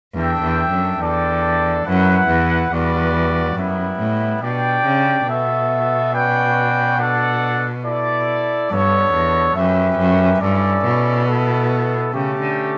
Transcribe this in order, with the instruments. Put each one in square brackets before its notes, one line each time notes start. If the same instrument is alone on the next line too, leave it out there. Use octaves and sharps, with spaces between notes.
[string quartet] E2 [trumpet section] D4 A4 E5 G5
[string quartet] E2
F#2
[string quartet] E2 [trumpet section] D4 A4 D5 G5
[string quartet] F#2 [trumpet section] E4 B4 F#5
[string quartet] E2
[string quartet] E2 [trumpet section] G3 B3 F#4 B4 D5
[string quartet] F#2 [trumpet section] G3 B3 E4
[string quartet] A2
[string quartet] B2 [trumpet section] D4 G4 D5 G5
[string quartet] C#3
[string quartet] B2 [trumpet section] B3 F#4 A4 E5
[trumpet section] C#4 F#4 B4 D5 G5
D4 A4 D5 F#5
E4 A4 D5
[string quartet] G2 [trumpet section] B3 D4 A4 C#5
[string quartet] E2
[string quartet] F#2 [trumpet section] C#4 G4 B4 E5
[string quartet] F#2
[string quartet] G2 [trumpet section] C#4 E4 A4 D5
[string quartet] B2
[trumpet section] B3 E4 A4
[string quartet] C#3 [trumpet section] A3 C#4 G4
[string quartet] D3